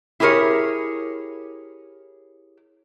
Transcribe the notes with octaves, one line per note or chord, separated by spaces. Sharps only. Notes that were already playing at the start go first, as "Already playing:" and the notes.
E4 G4 G#4 A#4 C#5